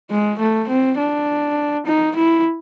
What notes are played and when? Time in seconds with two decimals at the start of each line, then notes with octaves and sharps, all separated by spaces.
0.10 G#3
0.39 A3
0.68 C4
0.98 D4
1.86 D#4
2.16 E4